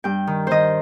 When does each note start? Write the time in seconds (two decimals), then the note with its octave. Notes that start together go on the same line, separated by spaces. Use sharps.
0.04 G2 G5
0.27 D#3
0.47 D#3 C5 D#5